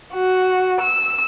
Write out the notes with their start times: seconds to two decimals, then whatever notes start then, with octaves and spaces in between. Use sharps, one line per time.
0.13 F#4
0.80 E6